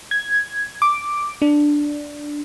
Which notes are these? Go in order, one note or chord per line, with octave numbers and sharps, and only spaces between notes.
G#6
D6
D4